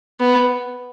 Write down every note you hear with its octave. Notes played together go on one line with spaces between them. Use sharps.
B3